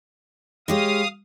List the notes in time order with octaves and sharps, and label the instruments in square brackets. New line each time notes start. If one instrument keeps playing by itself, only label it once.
[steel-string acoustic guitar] G#3 G4 C#5 [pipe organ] F5 D#6